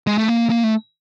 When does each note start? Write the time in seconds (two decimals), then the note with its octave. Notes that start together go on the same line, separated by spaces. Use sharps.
0.07 G#3
0.18 A3
0.28 A#3
0.50 A#3
0.64 A3